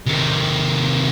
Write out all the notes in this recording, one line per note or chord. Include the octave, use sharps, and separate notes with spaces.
C3 D#3